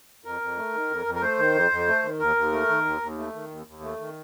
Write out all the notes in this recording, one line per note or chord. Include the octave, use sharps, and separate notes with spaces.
F2 A#4
F2
A3
D#3
F2
F2
A#4
A3 C5
D#3
F2
F2
A3
D#3
D#2 A#4
D#2
A3
D#3
D#2
D#2
A3
D#3
D#2
D#2
A3
D#3